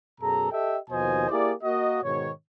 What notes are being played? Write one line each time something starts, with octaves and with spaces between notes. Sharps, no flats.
F#2 B2 G#4 A4 A#5
G4 A4 D#5 E5 G5
D#2 B2 F3 C5 D#5 G#5
A#3 E4 G4 G#4 D5
A#3 F#4 D#5
G#2 B2 D#3 C#5